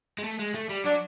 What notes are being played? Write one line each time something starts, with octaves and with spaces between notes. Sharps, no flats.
G#3
A3
G#3
A3
G3
F#3 D4